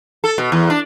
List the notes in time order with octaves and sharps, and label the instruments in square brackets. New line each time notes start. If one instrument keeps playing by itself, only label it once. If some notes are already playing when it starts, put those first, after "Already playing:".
[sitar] A4
B2
E2
D4